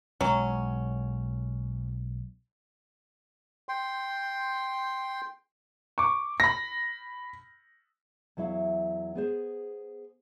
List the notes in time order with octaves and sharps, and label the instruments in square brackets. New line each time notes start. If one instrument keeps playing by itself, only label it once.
[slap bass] B1 G#3 [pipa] F#3 C#4
[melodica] G5 C6
[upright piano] C#6 D6
B5 A#6
[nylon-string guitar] E2 F#3 E4 E5 F5
B3 G#4 C5